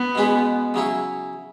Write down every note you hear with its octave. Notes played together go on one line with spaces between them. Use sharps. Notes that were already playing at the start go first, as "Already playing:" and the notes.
Already playing: B3
B2 G#3 C#4 G#4
C#3 F#3 C#4 E4